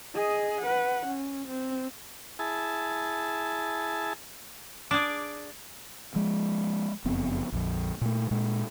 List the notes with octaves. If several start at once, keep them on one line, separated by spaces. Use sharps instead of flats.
G#4 D#5
B4 F#5
C#4
C4
E4 G#4 A5
D4 G#4 D6
F3 G#3
F#1 F2 B3 C4
A#1 F2
A#2 A3
A#2 G#3